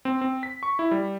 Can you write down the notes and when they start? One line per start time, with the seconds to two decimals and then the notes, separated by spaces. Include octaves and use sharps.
0.05 C4
0.21 C4
0.43 B6
0.63 C#6
0.79 E4
0.91 G3